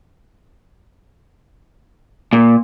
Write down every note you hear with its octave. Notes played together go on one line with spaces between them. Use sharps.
A#2